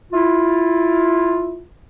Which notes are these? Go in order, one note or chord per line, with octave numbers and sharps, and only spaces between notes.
E4 F4